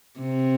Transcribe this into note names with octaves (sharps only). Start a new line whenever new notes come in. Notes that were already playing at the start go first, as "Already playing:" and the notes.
C3